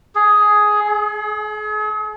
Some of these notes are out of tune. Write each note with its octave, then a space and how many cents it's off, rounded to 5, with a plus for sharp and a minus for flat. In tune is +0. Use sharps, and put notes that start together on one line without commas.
G#4 +10
G#4 +40